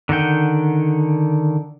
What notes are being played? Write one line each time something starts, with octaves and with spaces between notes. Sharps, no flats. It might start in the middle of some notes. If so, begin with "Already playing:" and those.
D3 D#3 F#5 G5